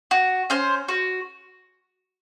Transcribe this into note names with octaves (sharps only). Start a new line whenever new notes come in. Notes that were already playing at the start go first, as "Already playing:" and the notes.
F#4
C#4 C5
F#4